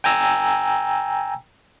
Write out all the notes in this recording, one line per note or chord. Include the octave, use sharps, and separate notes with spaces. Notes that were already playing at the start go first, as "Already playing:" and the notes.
G5 G#5 A#5 E6